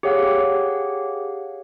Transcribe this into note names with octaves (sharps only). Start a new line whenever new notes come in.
G4 G#4 C#5 F5 F#5